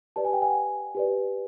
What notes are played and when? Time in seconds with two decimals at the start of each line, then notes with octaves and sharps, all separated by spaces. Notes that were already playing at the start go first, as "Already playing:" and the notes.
0.16 G4 B4 D5 A5
0.25 G#5
0.33 G5
0.42 F#5 G#5
0.95 G4 B4 D5